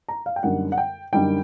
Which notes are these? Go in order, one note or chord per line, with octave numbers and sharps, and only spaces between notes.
A#5
F5
G5
F#2 D3 G3 A#3 D#4 F#5
F#5
G5
F#2 D3 G3 A#3 D#4 G5